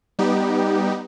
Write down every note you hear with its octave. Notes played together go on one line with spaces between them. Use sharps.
G3 B3 D#4 G4